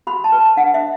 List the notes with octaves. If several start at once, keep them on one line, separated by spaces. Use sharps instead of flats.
F#4 B5
A5
B4
A5
D4 F#5
E5